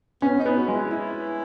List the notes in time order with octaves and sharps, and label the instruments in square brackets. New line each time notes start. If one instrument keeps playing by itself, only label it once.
[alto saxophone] B3 [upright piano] C#4
[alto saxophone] D#4
[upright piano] B3
[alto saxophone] F#4
[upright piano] G#3
[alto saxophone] E4
E4